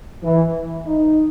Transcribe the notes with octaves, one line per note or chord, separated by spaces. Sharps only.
E3
D#4